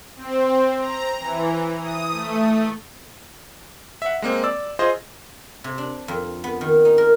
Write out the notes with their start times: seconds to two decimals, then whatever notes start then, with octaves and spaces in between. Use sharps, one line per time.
0.17 C4
0.78 A#5
1.19 E3
1.78 D#6
2.11 A3
4.02 E5 F#5
4.22 G#3 A#3 C4
4.43 D5 E6
4.79 F4 G#4 C5 D#5
5.64 C3
5.78 D4
6.08 F2
6.44 B3
6.61 D#3
6.85 D#4
6.98 A#4